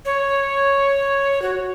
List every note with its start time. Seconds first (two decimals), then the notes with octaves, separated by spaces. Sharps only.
0.05 C#5
1.42 F#4